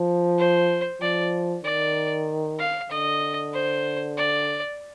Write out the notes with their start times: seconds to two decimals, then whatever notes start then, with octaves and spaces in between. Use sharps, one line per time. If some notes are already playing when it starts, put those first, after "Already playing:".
Already playing: F3
0.38 C5
1.01 F3 D5
1.65 D#3 D5
2.59 F5
2.90 D3 D#5
3.53 C5
4.17 D5